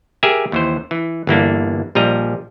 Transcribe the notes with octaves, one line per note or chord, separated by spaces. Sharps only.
G4 G#4 A#4 E5 G#5
D#2 E3 C5
E3
G1 E3 A#3 D4
A#1 F3 G3 D#5 A#5